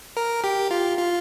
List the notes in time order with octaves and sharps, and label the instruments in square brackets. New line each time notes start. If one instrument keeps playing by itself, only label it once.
[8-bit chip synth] A#4
G4
F4
F4